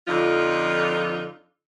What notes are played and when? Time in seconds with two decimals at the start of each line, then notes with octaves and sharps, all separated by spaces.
0.08 F2 D3 F3 D#4 F4